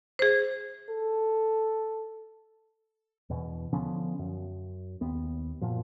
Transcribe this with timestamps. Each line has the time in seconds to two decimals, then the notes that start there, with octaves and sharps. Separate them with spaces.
0.19 G#4 C5
0.89 A4
3.30 E2 B2
3.73 D3 F3 B3 C#4
4.19 F#2
5.01 D#2 B3
5.61 F#2 A#2 F3